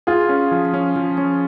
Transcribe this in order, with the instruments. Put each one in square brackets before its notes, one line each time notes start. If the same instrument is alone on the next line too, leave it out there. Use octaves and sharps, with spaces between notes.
[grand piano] F4 [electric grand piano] G#4
[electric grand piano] C#4
F3
C#4
F3
C#4